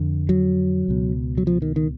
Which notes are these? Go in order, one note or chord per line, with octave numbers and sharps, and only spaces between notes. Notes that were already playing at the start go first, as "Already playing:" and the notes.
Already playing: F2 D3
F#3
C#2 B2
F#3
F3
D#3
D#3